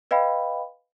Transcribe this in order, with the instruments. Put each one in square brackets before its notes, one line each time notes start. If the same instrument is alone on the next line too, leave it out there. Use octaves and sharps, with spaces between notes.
[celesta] B4 D#5 F5 G5 B5